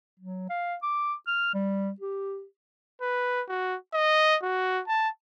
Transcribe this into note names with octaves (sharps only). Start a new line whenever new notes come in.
F#3
F5
D6
F6
G3
G4
B4
F#4
D#5
F#4
A5